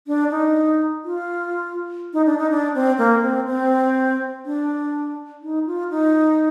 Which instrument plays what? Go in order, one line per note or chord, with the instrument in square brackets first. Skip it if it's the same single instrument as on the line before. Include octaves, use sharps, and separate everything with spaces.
[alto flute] D4
D#4
F4
D#4
D4
D#4
D4
C4
A#3
C4
C4
D4
D#4
F4
D#4